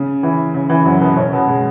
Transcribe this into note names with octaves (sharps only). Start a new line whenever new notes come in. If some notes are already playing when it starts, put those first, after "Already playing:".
Already playing: C#3
E3
C#3
E3
F#2 F#3
B2 B3
C#3 C#4
B2 B3
G#3